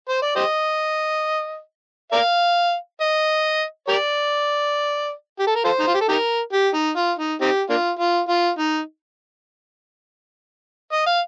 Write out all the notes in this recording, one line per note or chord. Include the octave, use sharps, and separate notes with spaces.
C5
D5
G4 C5 D#5
A#4 D5 F5
D#5
G4 A#4 D5
G4
A4
A#4
F4 A4 C5
D#4
F4
G4
A4
D#4 G4 A#4
G4
D#4
F4
D#4
C4 D#4 G4
A#3 D4 F4
F4
F4
D#4
D#5
F5